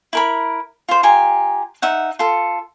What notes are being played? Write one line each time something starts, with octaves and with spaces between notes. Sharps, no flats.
E4 A#4 B5
F4 C5
F4 G4 G#5 A#5
D#4 E5 F#5
F4 A4